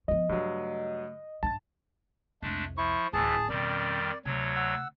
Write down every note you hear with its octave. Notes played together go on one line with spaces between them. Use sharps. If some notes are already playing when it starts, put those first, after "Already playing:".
F3 B3 D#5
G2 C#3 F#3 A3
G2 D4 A5 A6
C2 F2 G#3 A3 D4
F3 E4 C#6
D1 A1 D2 A2 E3 G#4 A5
F2 B2 D#3 G3 C#4 D5
D2 C3 F#3 C#5
F#5 E6